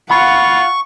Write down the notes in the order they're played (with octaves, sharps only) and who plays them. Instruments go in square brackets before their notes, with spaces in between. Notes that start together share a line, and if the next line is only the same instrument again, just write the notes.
[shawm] F4 [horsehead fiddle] F5 F#5 [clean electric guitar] B5 [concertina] C#6